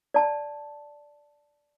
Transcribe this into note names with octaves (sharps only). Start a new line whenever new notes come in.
D5 A5